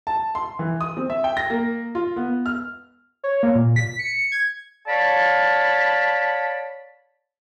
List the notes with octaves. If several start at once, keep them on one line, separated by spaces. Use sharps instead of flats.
A5
C6
E3
D#6
C4
E5
G5
A#6
A#3
F4
B3
F6
C#5
A#3
A#2
B6
C#7
G#6
C#5 D5 F5 A5 B5